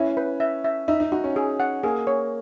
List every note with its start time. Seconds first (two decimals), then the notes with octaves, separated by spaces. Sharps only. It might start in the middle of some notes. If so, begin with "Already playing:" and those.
Already playing: C#4 E4
0.17 B4
0.40 E5
0.64 E5
0.88 D#4 E5
1.00 D#4
1.12 D#4 F#4
1.24 C#4
1.36 G#4
1.60 F#5
1.83 A#3 G#4
2.07 C#5